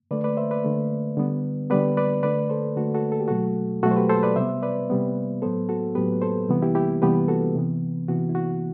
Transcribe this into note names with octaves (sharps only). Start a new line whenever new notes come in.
D3 A3 B4 D5
B4 D5
C5 E5
B4 D5
D3 A3
D3 G3 B3
D3 G3 B3 B4 D5
B4 D5
D3 A3 B4 D5
A4 C5
D3 A3 F#4 A4
F#4 A4
A4
G4
B2 F#3 A3 F#4 A4
B2 F#3 A3 F#4 A4
C5
G4 B4
A4 C5
B4 D5
C3 G3 B3 C5 E5
B4 D5
C3 G3 B3
A2 F#3 B3 A4 C5
F#4 A4
A2 F#3 B3 G4 B4
A4 C5
C3 E3 G3 B3
E4 G4
E4 G4
C3 E3 G3 B3 G4 B4
F#4 A4
C3 E3 B3
C3 E3 B3 F#4
E4
F#4